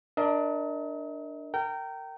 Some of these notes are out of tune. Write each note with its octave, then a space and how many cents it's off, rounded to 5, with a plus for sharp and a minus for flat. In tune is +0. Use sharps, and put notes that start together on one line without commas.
D4 +5 A#4 +0 D#5 +40
A#4 -25 G5 -20